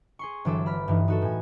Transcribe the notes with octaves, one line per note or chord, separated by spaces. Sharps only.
G#4 C6 C#6
G1 E3 F#3 A4 D6 E6
B5 F6 B6
G2 E3 D#4
D#4 F#4 A4
A2 G#5